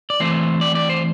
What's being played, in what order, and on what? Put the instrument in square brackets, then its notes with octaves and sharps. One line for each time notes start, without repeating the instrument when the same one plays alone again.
[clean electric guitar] D5
E3 A3 C4 C5
D5
D5
C5